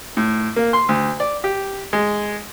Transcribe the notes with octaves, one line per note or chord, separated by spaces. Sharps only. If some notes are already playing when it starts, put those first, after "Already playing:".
A2
A#3
C6
D2
D5
G4
G#3